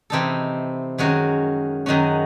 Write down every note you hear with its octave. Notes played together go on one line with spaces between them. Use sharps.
C3 E3 C4 D#4 A4
F#2 D#3 G#3 C#4 F#4
F#2 D#3 G#3 C#4 F#4